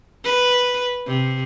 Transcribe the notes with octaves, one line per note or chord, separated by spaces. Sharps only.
B4
C3